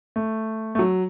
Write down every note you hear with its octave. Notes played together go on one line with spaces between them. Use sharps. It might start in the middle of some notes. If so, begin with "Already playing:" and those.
A3
A3
F#3